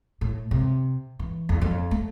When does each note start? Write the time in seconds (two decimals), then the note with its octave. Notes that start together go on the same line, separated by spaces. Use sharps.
0.21 A2
0.51 C3
1.19 E3
1.49 E2
1.61 F2
1.91 A3